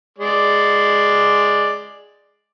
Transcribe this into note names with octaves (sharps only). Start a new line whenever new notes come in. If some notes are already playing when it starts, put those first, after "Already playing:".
G#3 D5